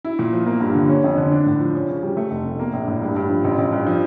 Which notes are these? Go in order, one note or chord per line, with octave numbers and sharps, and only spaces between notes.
E4
A#2
F3
A#3
G2
D3
C#4
F2
D3
D4
A2
F3
C#4
C#3
G3
A3
F1
F2
A#3
A#1
A2
G2
G2
F3
A1
A1
G2
F3